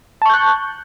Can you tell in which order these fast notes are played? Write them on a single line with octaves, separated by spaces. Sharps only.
A5 C#6 G6 F#6